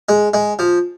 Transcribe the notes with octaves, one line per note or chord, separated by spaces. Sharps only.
G#3
G#3
F3